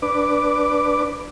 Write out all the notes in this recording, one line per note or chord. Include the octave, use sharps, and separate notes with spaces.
D4 B4 D6